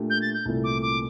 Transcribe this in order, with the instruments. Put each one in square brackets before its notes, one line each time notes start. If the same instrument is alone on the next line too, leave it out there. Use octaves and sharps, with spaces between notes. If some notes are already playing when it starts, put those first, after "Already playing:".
Already playing: [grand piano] A#2 A3 D4 G4
[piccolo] G6
A6
G6
[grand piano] C2 A#2 A3 E4 A4
[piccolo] D6
D6